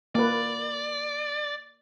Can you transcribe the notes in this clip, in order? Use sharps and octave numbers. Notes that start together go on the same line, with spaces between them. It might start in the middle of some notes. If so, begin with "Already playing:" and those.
A#3 B4 D5